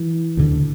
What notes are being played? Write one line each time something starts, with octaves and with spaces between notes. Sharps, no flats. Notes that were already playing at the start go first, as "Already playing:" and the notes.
Already playing: E3
D2 D3